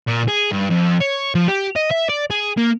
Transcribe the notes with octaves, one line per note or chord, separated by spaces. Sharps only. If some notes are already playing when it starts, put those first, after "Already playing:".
A#2
G#4
G2
F2
C#5
F3
G4
D#5
E5
D5
G#4
A#3